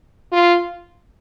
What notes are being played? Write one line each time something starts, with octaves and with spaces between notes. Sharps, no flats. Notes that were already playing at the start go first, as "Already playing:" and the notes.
F4